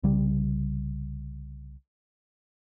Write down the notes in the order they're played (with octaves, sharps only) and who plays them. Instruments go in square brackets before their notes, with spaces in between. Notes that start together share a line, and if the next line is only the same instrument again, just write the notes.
[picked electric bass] C2 C#3 G3